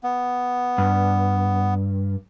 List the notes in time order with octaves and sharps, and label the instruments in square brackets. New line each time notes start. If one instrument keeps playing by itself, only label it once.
[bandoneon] B3
[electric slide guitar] G2